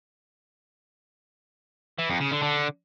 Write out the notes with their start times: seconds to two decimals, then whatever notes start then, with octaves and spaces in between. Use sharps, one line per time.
1.99 E3
2.09 F2
2.20 C#3
2.31 D3
2.42 D3